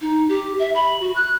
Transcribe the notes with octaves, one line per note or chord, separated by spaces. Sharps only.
D#4
G4
E5
B5
F#4
F#6